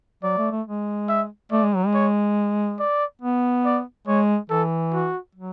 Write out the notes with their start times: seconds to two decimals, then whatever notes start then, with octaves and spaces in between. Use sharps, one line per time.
0.23 F#3 D5
0.38 A3
0.52 A3
0.67 G#3
1.09 E5
1.51 A3 D5
1.63 G#3
1.76 F#3
1.87 G#3
1.94 C#5
2.79 D5
3.22 B3
3.65 D5
4.07 G#3 C#5
4.50 E3 A4
4.93 F#4
5.35 F#3